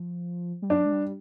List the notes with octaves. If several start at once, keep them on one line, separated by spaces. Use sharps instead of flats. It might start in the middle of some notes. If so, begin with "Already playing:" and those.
Already playing: F3
G3
F#3 D4
G#3
G3